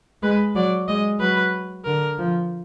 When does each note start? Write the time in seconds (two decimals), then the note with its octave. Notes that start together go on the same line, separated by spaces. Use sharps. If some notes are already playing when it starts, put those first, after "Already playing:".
0.22 G#3 B4
0.55 F#3 D5
0.88 G#3 D#5
1.20 F#3 B4
1.85 D3 A#4
2.18 F3